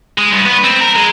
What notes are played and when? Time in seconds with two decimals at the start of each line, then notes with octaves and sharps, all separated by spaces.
0.18 G#3
0.32 G2
0.45 B3
0.64 C4
0.80 A#4
0.96 G#3